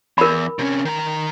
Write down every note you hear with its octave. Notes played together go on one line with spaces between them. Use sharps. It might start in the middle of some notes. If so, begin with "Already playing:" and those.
E2 A#4 B5
C3 C#4
D#3 A#5